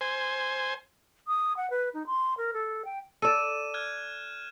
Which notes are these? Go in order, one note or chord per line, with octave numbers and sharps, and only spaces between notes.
C5 G#5
D#6
F#5
B4
D#4
C6
A#4
A4
G5
A4 D5 D#7 E7
F6 F#6 G#6